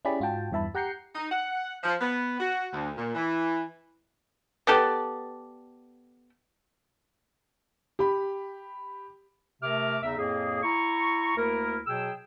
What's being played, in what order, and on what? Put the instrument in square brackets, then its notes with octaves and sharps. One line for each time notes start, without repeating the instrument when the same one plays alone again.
[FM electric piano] C#4 E4 G4 G#4 D5 B5
G#2 F4 F#4 G5 A5
E2 G2 E3 E5 A5 B5
G4 F#5 A#5 G6 C7 C#7
[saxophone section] D#4
F#5
F3
B3
F#4
D2
A#2
E3
[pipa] B3 G4 A4 D5
[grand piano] G4 B5
[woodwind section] C3 A3 A#4 E5 D6 F6
E2 C#3 D#4 E5
F2 A2 A#3 G#4
E4 A#5 C#6
D2 A#3 E4 A#4
B2 F#3 G#4 G5 E6